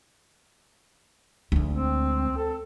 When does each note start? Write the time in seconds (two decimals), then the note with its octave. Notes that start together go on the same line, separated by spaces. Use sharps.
1.52 D2 G#3
1.70 C4
2.37 A4